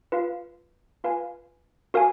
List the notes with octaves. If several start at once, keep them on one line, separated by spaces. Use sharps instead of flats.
F4 B4 F5
F4 B4 F5 G#5
F#4 A#4 F5 G#5